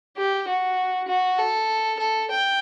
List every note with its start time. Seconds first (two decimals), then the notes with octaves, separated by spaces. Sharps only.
0.17 G4
0.47 F#4
1.08 F#4
1.38 A4
1.99 A4
2.30 G5